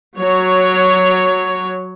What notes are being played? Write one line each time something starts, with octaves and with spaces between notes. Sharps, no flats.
F#3 C#5